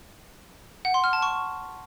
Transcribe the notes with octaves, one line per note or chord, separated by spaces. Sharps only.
F#5
C6
F6
A5
C#6